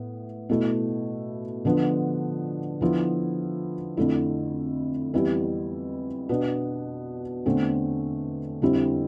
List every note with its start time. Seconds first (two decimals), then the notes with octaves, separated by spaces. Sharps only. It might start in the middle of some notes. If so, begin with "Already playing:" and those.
Already playing: A2 B3
0.49 B2 A3 E4
1.65 D3 F3 B3 D4
2.81 D3 F3 B3 E4
3.97 F2 D3 A3 E4
5.14 F2 E3 G3 B3 E4
6.29 B2 B3 D4
7.46 E2 D3 A3 C4
8.62 F2 D3 G3 C4 E4